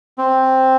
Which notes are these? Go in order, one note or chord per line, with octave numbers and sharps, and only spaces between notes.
C4